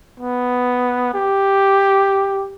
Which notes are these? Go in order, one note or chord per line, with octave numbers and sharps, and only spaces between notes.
B3
G4